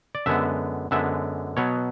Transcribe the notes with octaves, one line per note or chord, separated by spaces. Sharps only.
D5
F#2 D3 G#3 B3 E5
F#2 D3 G#3 B3 E5
B2 F#3 B3 C#5